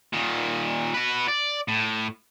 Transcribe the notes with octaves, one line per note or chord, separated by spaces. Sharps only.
A#2 D#3
F#4 B4
D5
A2